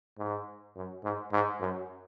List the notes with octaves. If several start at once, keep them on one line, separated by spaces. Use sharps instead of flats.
G#2
F#2
G#2
G#2
F#2